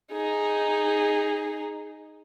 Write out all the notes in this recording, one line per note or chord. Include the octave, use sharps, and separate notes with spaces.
D#4 G#4